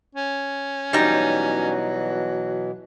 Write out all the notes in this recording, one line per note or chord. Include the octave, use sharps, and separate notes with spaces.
C#4
B2 E3 F#3 G3 D#4